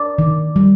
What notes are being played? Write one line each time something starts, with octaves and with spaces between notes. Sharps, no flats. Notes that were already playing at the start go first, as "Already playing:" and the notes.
Already playing: D5
D#3
G3